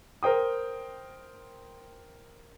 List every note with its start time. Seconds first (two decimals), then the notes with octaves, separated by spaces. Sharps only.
0.23 A#4 C5 G5 D#6